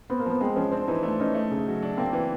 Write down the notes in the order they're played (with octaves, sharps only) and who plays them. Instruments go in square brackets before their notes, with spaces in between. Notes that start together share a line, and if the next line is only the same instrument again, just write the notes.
[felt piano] B3 [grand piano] C4
[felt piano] A#3
[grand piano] F3 [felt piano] B3
[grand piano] G#3 [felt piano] C4
[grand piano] F3 [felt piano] C#4
[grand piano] C4 [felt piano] D4
[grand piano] E3 [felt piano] D#4
[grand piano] A3 [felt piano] D4
[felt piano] C#4 [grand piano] D#4
[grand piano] A3
C#3
F#3
D4
[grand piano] A#3 [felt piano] C4
[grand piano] E3